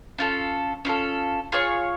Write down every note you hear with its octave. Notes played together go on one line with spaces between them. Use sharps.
C#4 F4 A4
C#4 F4 A4
F4 G#4 C#5